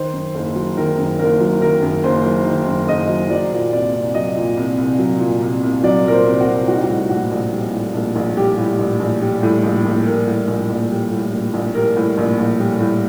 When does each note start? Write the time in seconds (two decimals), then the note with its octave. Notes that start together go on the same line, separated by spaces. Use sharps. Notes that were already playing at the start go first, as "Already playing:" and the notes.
Already playing: D#3 C5
0.13 F#2
0.34 F#1
0.56 F#3
0.77 D#3 A#4
0.98 F#2
1.19 F#1 A#4
1.40 F#3
1.61 D#3 A#4
1.82 F#2
2.04 F#1 C5
2.25 F#3
2.46 D#3
2.67 F#2
2.87 F#1 D#5
3.09 F#3
3.30 F#3 D5
3.51 A#2
3.72 C2 D5
3.94 C2
4.14 F#3 D#5
4.36 A#2
4.57 C2
4.78 C2
4.99 F#3
5.20 A#2
5.41 C2
5.63 C2
5.83 F#3 D5
6.05 A#2 A#4
6.12 C5
6.26 C2
6.41 F#4
6.47 C2
6.68 G3 F#4
6.76 D#4
6.84 F#4
6.89 A2
7.10 A#1 F#4
7.31 A#1
7.53 G3
7.73 A2
7.94 A#1
8.15 A#1
8.37 G3 G4
8.58 A2
8.79 A#1
9.00 A#1
9.22 G3
9.43 A2
9.63 A#1
9.85 A#1
10.06 G3 A#4
10.27 A2
10.48 A#1
10.70 A#1
10.91 G3
11.11 A2
11.33 A#1
11.54 A#1
11.75 G3 A#4
11.96 A2
12.18 A#1
12.38 A#1
12.60 G3
12.80 A2